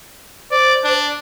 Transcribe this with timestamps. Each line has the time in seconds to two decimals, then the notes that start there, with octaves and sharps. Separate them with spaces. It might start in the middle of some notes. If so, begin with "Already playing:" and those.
0.51 C5 D5
0.84 D4